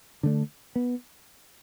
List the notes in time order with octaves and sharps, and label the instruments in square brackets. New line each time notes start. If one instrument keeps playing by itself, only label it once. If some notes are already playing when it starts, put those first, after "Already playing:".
[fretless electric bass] D3 A3 D4
B3